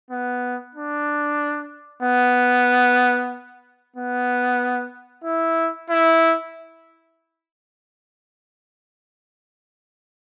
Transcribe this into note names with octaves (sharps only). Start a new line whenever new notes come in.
B3
D4
B3
B3
E4
E4